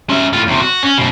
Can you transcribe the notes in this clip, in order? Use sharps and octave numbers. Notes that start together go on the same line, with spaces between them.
C#4 E5
A2 F4
E2 C3
F#4
C#4
F#2 B2